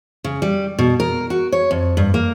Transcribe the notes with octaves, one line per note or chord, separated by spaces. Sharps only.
C#3
G3
B2
A#4
F#4
C#5
F2
G2
A#3